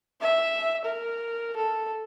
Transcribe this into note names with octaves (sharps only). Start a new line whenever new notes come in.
E5
A#4
A4